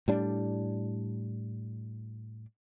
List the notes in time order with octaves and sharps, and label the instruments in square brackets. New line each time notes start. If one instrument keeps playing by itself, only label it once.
[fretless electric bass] A2 G3 D4